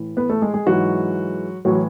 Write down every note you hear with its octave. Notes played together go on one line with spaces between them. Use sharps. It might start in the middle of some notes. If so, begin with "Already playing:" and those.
Already playing: A2 E3
B3 B4
A3 A4
G#3 G#4
G#3 G#4
G#2 E3 F#3 F#4
A2 E3 F#3 F#4